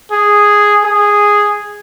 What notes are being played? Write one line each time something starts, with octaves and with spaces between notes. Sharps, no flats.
G#4
G#4